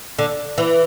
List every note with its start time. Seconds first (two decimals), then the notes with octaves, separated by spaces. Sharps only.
0.19 D3
0.58 E3